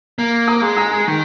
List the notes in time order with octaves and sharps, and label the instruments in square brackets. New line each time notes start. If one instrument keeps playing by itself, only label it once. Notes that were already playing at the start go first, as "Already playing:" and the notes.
[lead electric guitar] A#3
[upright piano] A#5 D#6
[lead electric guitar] G#3
[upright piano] A#5 D#6
[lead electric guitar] D#3